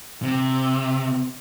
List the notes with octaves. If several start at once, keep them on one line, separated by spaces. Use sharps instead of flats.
C3